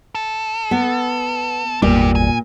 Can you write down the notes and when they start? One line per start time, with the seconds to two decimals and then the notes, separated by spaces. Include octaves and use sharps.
0.15 A4
0.71 B3
1.82 G#1 E2 A#2 G3 D4 G4
2.15 G#5